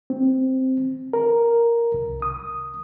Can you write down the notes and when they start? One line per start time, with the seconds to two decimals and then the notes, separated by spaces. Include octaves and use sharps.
0.10 C4
1.13 A#4
1.94 C2
2.22 D#6